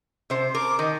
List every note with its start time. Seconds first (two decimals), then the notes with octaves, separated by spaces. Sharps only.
0.30 C3 C5
0.55 A#4 D6
0.79 D#3 D#5